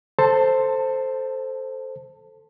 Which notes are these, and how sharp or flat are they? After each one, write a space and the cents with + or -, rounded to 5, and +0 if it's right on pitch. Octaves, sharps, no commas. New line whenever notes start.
A4 +0 C5 +0 A5 +25